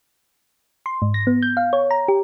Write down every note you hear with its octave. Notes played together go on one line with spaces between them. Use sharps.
C6
G#2
A#6
B3
G6
F5
C#5
A#5
G4